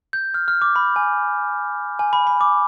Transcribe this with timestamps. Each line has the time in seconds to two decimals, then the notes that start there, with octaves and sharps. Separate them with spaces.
0.13 G6
0.34 F6
0.48 F6
0.62 D6
0.76 B5
0.96 G#5
1.99 G#5
2.13 B5
2.27 B5
2.41 D6